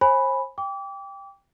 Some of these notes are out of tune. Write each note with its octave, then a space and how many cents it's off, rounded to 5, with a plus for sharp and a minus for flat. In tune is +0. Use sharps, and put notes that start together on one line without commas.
C5 +35 G#5 +0 B5 +0
G5 +15 D6 -30